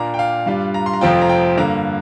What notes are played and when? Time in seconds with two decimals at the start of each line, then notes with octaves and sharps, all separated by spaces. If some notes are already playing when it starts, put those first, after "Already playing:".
Already playing: A#2 A#3 D4 A#5
0.14 G5
0.19 F5
0.46 G2 G3 D4 F4 F5
0.74 A#5
0.86 C6
0.93 A#5
1.01 F1 F2 F3 C4 F4 G5
1.22 A#5
1.29 G5
1.57 G2 D3 A#3 A#5